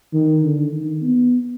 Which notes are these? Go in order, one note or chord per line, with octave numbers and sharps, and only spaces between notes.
D#3
D3
D#3
B3